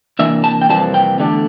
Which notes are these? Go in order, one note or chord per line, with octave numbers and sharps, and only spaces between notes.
C3 E3 A#3 D4 E5
A5
G5
F2 C3 E3 G3 A#3 A5
G5
E2 D3 A3 D4